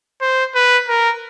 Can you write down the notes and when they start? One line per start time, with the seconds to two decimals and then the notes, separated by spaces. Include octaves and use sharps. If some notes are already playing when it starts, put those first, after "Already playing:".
0.21 C5
0.55 B4
0.89 A#4